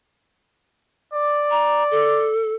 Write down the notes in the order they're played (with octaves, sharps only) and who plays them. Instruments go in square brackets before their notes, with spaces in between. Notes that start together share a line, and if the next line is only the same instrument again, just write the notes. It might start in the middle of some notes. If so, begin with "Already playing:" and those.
[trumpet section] D5
[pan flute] A#5
A4